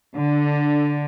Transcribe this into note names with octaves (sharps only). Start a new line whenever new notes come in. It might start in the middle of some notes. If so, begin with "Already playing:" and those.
D3